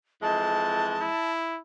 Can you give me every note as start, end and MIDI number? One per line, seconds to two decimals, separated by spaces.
0.22 1.09 41
0.22 1.09 52
0.22 1.09 56
0.22 1.31 81
1.01 1.59 64